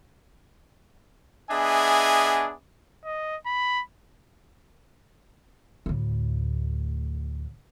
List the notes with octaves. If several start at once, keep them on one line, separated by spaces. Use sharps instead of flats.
B3 D4 G#4 D#5 E5 G#5
D#5
B5
D2 A2